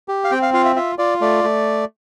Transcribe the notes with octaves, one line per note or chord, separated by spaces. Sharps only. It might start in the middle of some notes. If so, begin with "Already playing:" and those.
G4
F5
C4 G5
F5
F4 F5
E5
F4 E5
F4 D5
A3 D5
A3